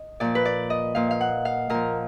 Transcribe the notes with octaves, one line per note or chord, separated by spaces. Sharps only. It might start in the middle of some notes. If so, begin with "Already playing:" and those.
Already playing: D#5
A#2 F3 D5
B4
D5
D#5
A#2 F3 F5
F5
F#5
F5
A#2 F3 A#4